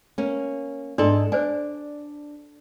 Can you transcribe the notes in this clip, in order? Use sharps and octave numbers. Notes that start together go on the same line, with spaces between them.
A#3 C#4
G#2 D4 A4 D5 C6
D4 C5 D5 G#5